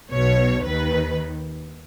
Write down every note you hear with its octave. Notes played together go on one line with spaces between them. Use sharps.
B1 B2 C#5
D#2 D#3 B4